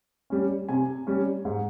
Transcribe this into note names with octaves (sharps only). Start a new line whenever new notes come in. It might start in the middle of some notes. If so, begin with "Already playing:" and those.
G3 C#4
C3 G#5
G3 C#4
G#2